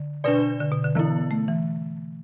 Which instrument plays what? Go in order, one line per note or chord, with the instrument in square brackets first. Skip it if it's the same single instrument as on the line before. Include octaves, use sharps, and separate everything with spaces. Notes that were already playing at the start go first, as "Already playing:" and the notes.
Already playing: [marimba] D3
[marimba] B2 [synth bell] D4 B4 D5
[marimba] D3
B2
D3
[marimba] D3 [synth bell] E3 B3 E4
[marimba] A3
E3